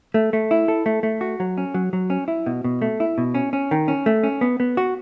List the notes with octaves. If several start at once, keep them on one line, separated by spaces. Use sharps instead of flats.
A3
A3
E4
A4
A3
A3
F#4
F#3
C#4
F#3
F#3
C#4
E4
B2
B2
A3
E4
B2
C#4
C#4
D#3
C#4
A3
C#4
B3
B3
F#4